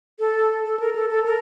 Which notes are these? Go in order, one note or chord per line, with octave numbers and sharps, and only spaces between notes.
A4
A4
A#4
A4
A4
A#4